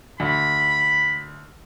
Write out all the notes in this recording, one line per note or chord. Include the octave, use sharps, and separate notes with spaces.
D2 B5